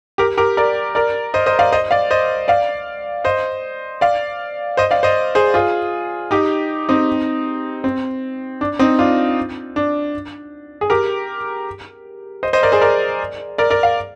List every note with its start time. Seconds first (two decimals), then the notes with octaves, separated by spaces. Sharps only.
0.18 G4 A#4
0.37 G4 A#4
0.57 A#4 D5
0.95 A#4 D5
1.34 C5 D#5
1.46 C5 D#5
1.59 D5 F5
1.72 C5 D#5
1.91 D5 F5
2.11 C5 D#5
2.48 D5 F5
3.24 C5 D#5
4.01 D5 F5
4.77 C5 D#5
4.91 D5 F5
5.03 C5 D#5
5.35 G#4 C5
5.54 F4 G#4
6.31 D#4 G4
6.89 C4 D#4
7.84 C4
8.61 D4
8.79 C4 D#4
8.99 D4 F4
9.76 D4
10.81 G#4
10.90 G4 A#4
12.43 C5 D#5
12.53 C5 D#5
12.63 A#4 D5
12.72 G#4 C5
12.81 A#4 D5
13.58 A#4 D5
13.70 A#4 D5
13.83 F5